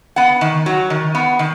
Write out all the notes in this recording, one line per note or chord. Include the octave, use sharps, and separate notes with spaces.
B3 F#5
D#3
F#3
D#3
B3
D#3